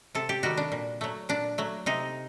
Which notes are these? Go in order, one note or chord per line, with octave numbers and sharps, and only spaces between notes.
C3 A4
G4
D#3 G3 F#4
D4
A#2
F#3 A3
A#2 D4
F#3 A3
C3 D#4